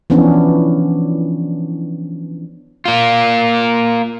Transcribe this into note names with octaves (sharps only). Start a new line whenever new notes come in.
E3 F3 B3 C#4 D4
A#3 F4